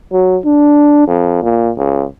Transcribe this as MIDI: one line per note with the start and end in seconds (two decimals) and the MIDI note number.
0.12 0.37 54
0.45 1.05 62
1.07 1.41 41
1.43 1.71 46
1.78 2.04 37